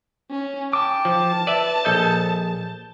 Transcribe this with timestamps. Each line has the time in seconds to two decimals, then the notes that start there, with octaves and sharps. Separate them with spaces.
0.31 C#4
0.73 G5 A5 D6
1.05 F3
1.47 B4 D5 E5
1.85 A#1 A4 D#5 G6